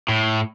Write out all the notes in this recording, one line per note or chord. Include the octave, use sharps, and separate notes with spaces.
A2